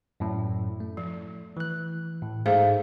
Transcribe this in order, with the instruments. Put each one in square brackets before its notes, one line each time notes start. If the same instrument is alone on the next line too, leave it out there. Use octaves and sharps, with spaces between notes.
[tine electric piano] F#2 A2
A3
[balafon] F3
[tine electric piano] E3 F#6
A2
[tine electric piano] G#2 A3 D#4 [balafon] G#4 C5 F5